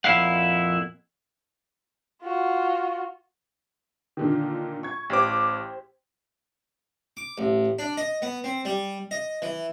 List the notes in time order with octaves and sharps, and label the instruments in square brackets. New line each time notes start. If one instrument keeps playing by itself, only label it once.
[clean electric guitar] F2 A#2 E4 F5 F#5
[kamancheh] F4 F#4
[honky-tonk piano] A#2 D3 D#3
C#6 G#6
[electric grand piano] A1 D6 [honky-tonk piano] G4 C5
[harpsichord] D6
A1
D4
D#5
B3
C4
G3
D#5
E3